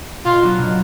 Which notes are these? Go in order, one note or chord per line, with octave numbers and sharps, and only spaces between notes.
B2 F4
F#3 B3 D4 F#4
B2